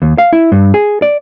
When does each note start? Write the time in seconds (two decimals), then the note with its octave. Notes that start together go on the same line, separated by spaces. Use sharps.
0.02 D#2
0.18 F5
0.33 E4
0.52 G2
0.74 G#4
1.02 D5